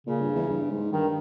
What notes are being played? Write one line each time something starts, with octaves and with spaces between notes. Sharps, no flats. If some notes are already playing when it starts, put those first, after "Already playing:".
A#2 C#3
G2
E2
G2
G#2
G2 D#3